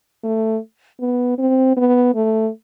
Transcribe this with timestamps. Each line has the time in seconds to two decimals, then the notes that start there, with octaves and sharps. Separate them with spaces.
0.24 A3
1.00 B3
1.38 C4
1.77 B3
2.15 A3